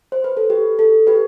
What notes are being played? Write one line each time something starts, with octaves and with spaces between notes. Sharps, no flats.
C5
B4
A4
G4
A4
G4 B4